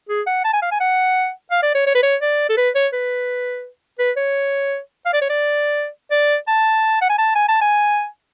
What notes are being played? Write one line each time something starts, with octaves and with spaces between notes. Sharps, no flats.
G#4
F#5
A5
G#5
F5
G#5
F#5
F5
D5
C#5
C#5
B4
C#5
D5
A4
B4
C#5
B4
B4
C#5
F5
D5
C#5
D5
D5
A5
F#5
G#5
A5
G#5
A5
G#5